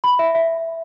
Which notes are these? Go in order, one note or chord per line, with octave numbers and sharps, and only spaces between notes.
B5
E5
E5